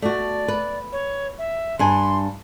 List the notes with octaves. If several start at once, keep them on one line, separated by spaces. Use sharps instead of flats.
A3 F#4 D5
B4
C#5
E5
G2 D4 G#5 C6